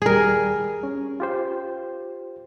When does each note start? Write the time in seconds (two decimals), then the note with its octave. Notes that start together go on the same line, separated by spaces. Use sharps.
0.02 D#2 G3 G#4 A#4
0.83 C#4
1.20 F4 G4 C5